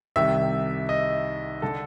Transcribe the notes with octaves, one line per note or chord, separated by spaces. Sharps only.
C2 C3 D#3 E5
D#5
D3 A4